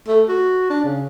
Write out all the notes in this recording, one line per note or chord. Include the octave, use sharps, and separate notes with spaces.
A3
F#4
D4
C#3